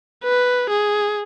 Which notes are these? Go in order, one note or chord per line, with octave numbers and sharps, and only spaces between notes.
B4
G#4